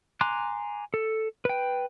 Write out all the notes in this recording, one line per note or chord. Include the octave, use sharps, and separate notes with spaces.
G#5 A#5 C6 D6 F#6
A4
B4 G5